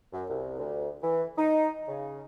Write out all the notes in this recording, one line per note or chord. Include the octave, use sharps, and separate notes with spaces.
F#2
C2
D2
E3
D#4
C#3